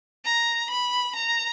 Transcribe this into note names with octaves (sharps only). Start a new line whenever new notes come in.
A#5
B5
A#5